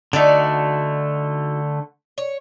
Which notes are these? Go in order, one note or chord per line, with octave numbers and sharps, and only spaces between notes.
D3 A3 D#4 F#4 D5
C#5